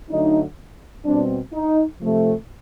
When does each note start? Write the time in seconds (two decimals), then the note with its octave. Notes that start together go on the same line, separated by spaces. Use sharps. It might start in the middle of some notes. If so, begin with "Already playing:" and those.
0.10 D3 F#3 A3 D4 D#4
1.06 B2 G3 C4 D4
1.53 D#4
2.00 C3 F3 A3 C4